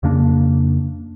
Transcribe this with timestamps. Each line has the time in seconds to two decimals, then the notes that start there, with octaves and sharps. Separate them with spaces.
0.03 F2 C#3 A#3 D4